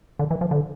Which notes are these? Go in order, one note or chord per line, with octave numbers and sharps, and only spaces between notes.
D3
E3
F3
D3